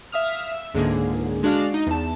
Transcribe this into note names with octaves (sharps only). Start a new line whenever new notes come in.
E5 F5 D#6 F6
E5
C#2 G#2 D3 A#3 G#4
G#3 D4 F#4 D5 F5
D#4
E2 A5